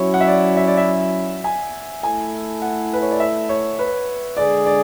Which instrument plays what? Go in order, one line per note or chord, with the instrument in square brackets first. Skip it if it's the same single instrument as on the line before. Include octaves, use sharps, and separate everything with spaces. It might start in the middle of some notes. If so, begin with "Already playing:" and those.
Already playing: [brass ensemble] F#3 C#4 E4 [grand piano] C#5
[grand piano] F#5
E5
D5
E5
D5
E5
G#5
[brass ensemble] A3 E4 A4 [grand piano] G#5
[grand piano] F#5
B4
C#5
D5
E5
C#5
B4
[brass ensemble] D3 G#3 D4 G#4 [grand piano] D5
[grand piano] D5